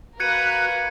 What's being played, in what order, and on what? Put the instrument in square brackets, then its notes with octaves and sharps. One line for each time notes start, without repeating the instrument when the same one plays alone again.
[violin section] A#3 A#4 B4 [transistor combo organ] F#4 [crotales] G#6 C#7 D#7